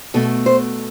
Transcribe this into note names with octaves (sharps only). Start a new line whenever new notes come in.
B2 A3 A4
C5